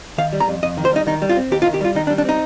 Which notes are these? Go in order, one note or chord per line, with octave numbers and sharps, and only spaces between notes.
D#3 F5
G3
A#5
F2
F2 D#5
D#3
C5
G3 D#4
D#3 D#4
G3
F4
C4
D#2 G4
F4
D#3
G4
G3 F4
D#3 D#4
D4
G3
D4
C4 D#4